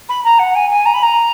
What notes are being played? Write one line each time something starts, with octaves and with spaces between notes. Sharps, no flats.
B5
A#5
F#5
G#5
G#5
A#5
B5
A#5